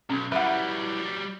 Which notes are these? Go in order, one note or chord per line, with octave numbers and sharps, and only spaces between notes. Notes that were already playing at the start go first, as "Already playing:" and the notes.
B1 C#4
F#3 G3 E4 B4 E5 F#5